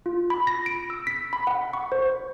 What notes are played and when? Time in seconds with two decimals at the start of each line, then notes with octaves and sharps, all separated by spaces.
0.06 F4
0.30 B5
0.47 A#6
0.66 D7
0.90 E6
1.07 B6
1.33 B5
1.47 F#5
1.73 C#6
1.92 C5